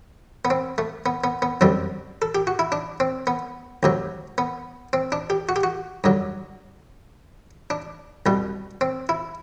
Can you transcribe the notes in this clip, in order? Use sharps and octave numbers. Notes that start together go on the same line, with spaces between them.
B3
C4
A3
B3
B3
B3
F#2 D3 G3 C4
A4
G4
F#4
E4
D4
C4
B3
D2 C3 F#3
B3
C4
D4
G4
F#4
G4
F#4
G2 D3 F#3
D4
C2 B2 G3
C4
E4